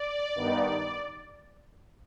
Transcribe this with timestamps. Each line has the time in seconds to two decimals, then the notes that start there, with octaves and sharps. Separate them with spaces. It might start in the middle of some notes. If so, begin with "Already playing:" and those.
Already playing: D5
0.35 G2 D#3 B3 D#4